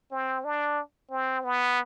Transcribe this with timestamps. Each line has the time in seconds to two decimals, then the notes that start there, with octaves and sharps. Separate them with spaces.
0.12 C4
0.45 D4
1.11 C4
1.45 B3